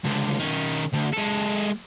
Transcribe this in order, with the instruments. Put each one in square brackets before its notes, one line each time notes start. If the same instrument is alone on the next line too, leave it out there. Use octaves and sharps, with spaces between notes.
[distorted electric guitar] C#2 D3
D#3 C#4
D2
G#3 A4